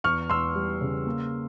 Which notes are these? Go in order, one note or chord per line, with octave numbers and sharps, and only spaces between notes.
E2 C#6 F6
E2 C6 E6
G3
C#3
A#3